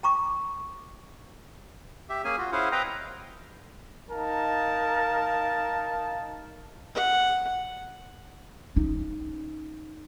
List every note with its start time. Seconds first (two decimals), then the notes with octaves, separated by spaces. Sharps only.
0.03 G5 A#5 C#6 D6
2.09 G4 E5
2.24 A#3 C#4 G#4 G#5
2.38 F4 F#4
2.52 C#4 E4 G#4 C5 F5 F#5
2.72 C4 B4 D#5 F5 G5 A#5
4.11 D#4 A#4 F5 A5
6.95 F#5
8.76 C#4 D#4